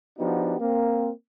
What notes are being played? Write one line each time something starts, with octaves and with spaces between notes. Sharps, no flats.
F3 B3 D4 D#4 F#4 G4
A#3 C4